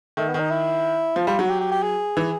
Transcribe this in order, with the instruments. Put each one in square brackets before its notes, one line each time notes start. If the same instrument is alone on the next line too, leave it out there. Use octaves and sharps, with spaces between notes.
[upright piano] D#3 [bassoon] A3
[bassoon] B3
[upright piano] D#3 [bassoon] D#4
[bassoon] E4
[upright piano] F3 [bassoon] F4
[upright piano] G3 [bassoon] F4
[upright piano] F#3 [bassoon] F#4
[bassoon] G4
G4
G4
G#4
[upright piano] E3